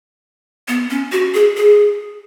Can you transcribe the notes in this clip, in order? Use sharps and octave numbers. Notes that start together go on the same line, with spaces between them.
B3
C#4
F#4
G#4
G#4